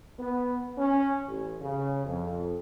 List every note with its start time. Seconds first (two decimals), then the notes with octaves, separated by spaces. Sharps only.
0.19 B3
0.78 C#4
1.27 A1
1.61 C#3
2.06 F2